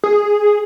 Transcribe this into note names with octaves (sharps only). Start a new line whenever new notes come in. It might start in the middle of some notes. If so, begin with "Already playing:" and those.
G#4